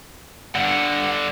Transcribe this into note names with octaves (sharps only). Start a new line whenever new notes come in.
G2 D3 F#5